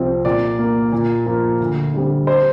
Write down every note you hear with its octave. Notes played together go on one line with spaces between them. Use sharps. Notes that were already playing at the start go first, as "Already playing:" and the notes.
Already playing: C2 C3 F3 C4
A#2 D5
A#3
A#2
F3 A#3
D2
D3 G3 C4
C5